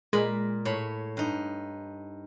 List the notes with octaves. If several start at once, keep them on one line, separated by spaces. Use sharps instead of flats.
A#2 G#3 A#4 B5
A2 C#5 B5
G2 D#4